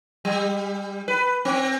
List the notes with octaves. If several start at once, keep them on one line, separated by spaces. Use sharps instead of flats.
G3
B4
C4